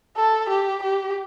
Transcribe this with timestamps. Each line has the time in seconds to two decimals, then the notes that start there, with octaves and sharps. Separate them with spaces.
0.16 A4
0.49 G4
0.83 G4